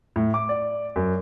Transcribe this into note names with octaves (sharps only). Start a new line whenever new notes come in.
A2
D6
D5
F#2